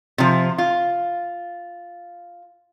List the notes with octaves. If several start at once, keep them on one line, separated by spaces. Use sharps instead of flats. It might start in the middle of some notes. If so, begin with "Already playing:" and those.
C3 F3
F4